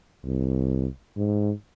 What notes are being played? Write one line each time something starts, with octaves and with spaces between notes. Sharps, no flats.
C2
G#2